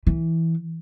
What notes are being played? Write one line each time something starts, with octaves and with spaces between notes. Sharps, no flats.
E3